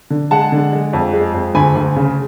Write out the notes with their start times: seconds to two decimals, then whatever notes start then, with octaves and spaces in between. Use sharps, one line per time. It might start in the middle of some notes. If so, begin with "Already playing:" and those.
0.10 D3
0.31 G#3 F#5 A5
0.52 D3
0.73 G#3
0.93 F2
1.13 G#3
1.34 F2
1.55 D2 G#5 B5
1.76 D2
1.96 C#3